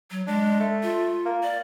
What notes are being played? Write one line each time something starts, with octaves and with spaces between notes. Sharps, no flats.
F#3
G#3 D4
A3
F4
A#3
D5